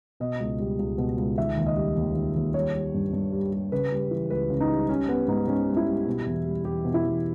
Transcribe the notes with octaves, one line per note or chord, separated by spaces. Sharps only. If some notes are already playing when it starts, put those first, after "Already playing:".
B2 D#5
C#2
G3
C#2
B2
C#2
D#3 E5
D#2
D#5
G3
D#2
D#3
D#2
G3 C#5
G3
G2
G2
G3
G3
C#3 B4
G3
E3
C#2 B4
C#3
D#4
G3
G3 C#4
G3 B3
G#2 D#4
G#2 C#4
G3
E4
G3
B2
E2
G3
E2 G4
B2
E4
E2